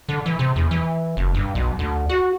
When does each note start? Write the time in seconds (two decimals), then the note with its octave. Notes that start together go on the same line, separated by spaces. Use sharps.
0.09 D3
0.26 E3
0.39 C3
0.56 E2
0.71 E3
1.17 F#1
1.34 G2
1.55 B1
1.79 D2
2.09 F#4